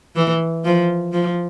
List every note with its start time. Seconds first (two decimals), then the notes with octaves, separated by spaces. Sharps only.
0.16 E3
0.64 F3
1.13 F3